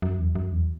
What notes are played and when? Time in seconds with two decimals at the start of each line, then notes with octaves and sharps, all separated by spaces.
0.02 F#2
0.19 E2
0.35 F#2
0.52 E2